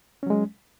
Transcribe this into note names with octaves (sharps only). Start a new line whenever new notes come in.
F#3 G#3 C#4